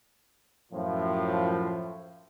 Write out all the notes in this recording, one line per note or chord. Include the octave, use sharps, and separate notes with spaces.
F#2 A2 F3